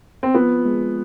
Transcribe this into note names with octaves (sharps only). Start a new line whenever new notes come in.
C4
F3 B3
G#3